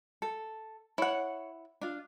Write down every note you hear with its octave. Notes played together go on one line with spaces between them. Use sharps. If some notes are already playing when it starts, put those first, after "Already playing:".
A4
E4 C#5 F#5
D4 F4